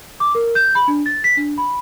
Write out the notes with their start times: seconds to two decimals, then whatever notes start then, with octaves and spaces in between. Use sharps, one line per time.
0.20 D6
0.35 A#4
0.55 G6
0.75 B5
0.88 D4
1.06 A6
1.24 B6
1.37 D4
1.58 B5